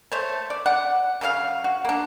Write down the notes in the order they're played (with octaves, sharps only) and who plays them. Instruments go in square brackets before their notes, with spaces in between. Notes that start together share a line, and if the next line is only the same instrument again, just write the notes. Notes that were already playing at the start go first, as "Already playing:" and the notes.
[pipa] A3 C5 C#5
D5
D5 F#5
C#3 F#3 D#4 F5
F#4
A#3 D4